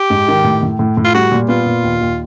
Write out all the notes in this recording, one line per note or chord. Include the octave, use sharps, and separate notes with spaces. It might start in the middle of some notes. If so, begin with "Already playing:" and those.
Already playing: G4
G#2
D#3
A2
A2
A2
A2
F4
G3 F#4
A#2
B3 F4
A#2
D#2
D#2